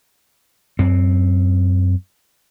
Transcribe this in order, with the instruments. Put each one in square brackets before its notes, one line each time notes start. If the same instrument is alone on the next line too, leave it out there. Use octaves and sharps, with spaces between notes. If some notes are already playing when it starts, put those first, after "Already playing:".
[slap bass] F#2 C4